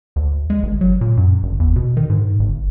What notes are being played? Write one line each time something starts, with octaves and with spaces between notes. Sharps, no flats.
D2
G#3
G1
F#3
A#2
F#2
G1
E2
B2
D#3
G#2
G1